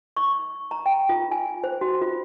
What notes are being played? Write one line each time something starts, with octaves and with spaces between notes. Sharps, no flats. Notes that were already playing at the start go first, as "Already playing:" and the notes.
C#6
A#5
G5
F4
G#5
C5
F#4
F4